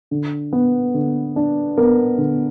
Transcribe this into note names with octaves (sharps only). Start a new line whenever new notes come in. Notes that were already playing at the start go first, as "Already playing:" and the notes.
D3
B3
D3
D4
B3 A#4
D3